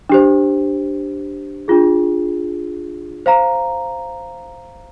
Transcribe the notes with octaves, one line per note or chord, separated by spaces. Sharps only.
D4 G4 C5
D4 F4 G#4
C5 F5 A#5